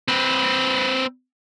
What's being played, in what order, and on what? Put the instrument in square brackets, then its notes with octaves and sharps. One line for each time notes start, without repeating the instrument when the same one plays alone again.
[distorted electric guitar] C4 B4